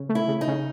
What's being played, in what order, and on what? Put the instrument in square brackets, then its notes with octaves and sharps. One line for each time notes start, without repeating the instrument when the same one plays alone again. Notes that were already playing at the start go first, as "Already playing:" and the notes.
Already playing: [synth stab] C#3
A3
[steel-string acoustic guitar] E4
[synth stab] C#3
[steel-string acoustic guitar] D#4
[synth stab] C#3